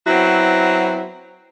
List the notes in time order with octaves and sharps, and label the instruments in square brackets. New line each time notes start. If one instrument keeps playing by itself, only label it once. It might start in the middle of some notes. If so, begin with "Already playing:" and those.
[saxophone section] F#3 B3 C4 E4 F#4